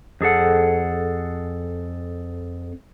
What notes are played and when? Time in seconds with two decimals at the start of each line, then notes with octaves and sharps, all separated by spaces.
0.21 F2 G#4 A4 F#5